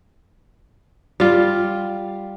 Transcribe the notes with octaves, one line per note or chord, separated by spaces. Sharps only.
G3 F4